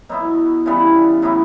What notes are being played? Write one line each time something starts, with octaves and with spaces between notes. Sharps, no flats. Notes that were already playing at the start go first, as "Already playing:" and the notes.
B2 F#3 B3 E4
C#3 E3 G3 B3
A2 F#3 B3 E4